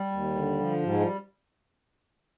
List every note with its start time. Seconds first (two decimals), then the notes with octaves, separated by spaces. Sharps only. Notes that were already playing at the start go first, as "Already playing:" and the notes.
Already playing: G3
0.11 D#2
0.35 D3
0.59 F3
0.84 G#2 G3
0.92 G#3
1.00 G3